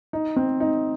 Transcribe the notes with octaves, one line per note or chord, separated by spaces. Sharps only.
D#4
C4
D#4